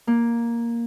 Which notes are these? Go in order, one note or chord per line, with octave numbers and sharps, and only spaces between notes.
A#3